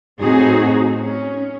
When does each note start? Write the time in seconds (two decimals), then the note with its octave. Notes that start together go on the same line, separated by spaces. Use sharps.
0.20 A2 C4 D#4 F#4 G#4
0.97 C#4